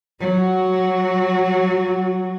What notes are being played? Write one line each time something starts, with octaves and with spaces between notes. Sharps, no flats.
F#3 F#4